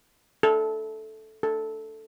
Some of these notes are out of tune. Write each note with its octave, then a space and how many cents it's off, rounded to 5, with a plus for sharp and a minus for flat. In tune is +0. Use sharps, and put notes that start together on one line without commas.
A4 -10
A4 +0